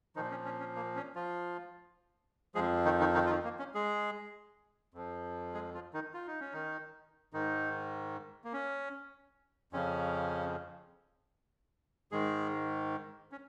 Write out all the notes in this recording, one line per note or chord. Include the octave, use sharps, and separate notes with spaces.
A#2 D#3 F3 D#4
C#4
C#4
C#4
A#3
C#4
F3 F4
F2 F3 G#3 G#4
D#3 D#4
D#3 D#4
D#3 D#4
F4
D#3 D#4
A#3
C#4
G#3 G#4
F2 F3
G#3 G#4
F3 F4
D#3 D#4
F4
D#4
C#4
D#3 D#4
G#2 D#3 D#4
A#3
C#4
F2 C#3 F3 C#4
G#2 D#3 G#3 G#4
C#4